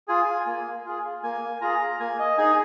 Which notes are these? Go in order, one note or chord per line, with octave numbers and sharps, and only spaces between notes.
F4 G#4 G#5
A#3
F4 G#4
A#3 G#5
F4 G#4 A#5
A#3 G#5
D#5
D#4 G#4 G#5